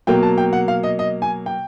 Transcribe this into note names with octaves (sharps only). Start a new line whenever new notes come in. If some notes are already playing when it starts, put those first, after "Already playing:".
B2 F#3 A#3 G5
A5
G5
F#5
F5
D#5
D#5
G#5
G5